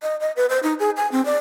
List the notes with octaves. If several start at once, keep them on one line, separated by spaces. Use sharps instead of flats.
D#5
D#5
B4
C5
D#4
G#4
G#5
C4
D5